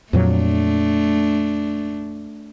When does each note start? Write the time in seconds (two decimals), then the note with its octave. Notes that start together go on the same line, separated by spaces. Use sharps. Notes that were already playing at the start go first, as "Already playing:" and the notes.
0.13 F2 A#2 F#3 A3 D4